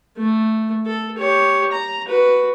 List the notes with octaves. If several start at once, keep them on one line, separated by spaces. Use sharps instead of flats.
A3
A4
G4 C#5
A#5
F#4 B4